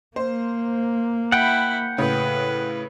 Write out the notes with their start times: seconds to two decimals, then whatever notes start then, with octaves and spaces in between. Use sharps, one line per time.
0.16 A#3 C5
1.32 E4 F#5 G5 B5
1.98 A2 C#3 B4